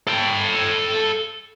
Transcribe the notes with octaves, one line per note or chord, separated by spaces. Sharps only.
A4 G5